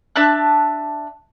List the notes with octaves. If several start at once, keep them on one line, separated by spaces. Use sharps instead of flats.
D4 E5 A5 F#6